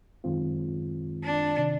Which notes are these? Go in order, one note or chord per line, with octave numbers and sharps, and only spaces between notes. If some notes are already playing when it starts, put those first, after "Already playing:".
F#2 D#3 G#3 C4 F4
D4
C3 D#3